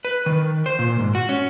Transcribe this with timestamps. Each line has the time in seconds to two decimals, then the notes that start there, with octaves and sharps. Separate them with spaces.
0.05 B4
0.26 D#3
0.66 C5
0.79 A#2
0.99 G#2
1.15 F#4
1.29 C#4